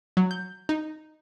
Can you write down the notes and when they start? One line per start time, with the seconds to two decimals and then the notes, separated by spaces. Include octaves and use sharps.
0.17 F#3
0.31 G6
0.69 D#4